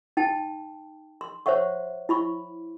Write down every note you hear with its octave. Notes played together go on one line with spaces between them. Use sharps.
D#4 G5 A5
C6
C5 C#5 E5 F#5 C#6
E4 B5 C#6